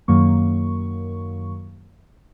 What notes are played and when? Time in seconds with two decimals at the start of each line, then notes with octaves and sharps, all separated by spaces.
0.08 F#2 D#3 F#3 A#3 C#6